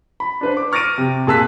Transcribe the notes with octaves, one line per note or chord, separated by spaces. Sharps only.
B5
D4 B4 C5
D6
C#6 F6 A6 A#6 D7 D#7
C3
A#2 G#4 A5 E6 F#6 B6